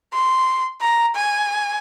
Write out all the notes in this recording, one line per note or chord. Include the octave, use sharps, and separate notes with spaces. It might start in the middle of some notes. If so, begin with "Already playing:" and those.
C6
A#5
G#5